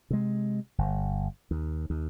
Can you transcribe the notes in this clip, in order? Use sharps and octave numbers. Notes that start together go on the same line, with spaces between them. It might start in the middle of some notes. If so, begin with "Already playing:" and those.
C3 G#3
G1
D#2
D#2